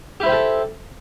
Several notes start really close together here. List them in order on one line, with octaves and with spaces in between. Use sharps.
G4 E4 C5 G5 A4